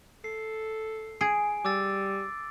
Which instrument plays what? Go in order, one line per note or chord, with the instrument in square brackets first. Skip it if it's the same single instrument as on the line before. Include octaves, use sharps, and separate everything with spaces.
[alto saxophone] A4 [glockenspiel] C7
[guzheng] G#4 [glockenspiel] D7
[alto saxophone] G3 [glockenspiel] D6 E6 A6